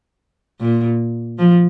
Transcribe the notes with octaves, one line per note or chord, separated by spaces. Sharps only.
A#2
F3